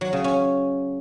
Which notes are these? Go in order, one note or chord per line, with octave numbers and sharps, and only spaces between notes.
F#3
C#3
C#4